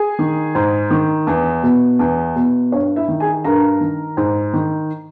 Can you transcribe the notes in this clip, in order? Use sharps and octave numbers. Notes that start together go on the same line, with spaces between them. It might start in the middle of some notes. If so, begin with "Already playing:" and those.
Already playing: G#4 G#5
D#3
G#2
D#3
E2
B2
E2
B2
G2 C#5
E4 E5
D#3
G#4 G#5
G2 A#4 A#5
D#3
G#2
D#3